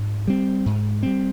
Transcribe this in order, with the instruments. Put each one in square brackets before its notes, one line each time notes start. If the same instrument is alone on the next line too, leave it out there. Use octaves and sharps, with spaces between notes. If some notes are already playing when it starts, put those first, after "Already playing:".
Already playing: [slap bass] G#2
G3 C4
G#2
G3 C4